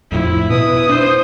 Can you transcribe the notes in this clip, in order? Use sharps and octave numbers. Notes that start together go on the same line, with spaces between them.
F2 A2 F3 E4
B2 B4 D#6
D4 C5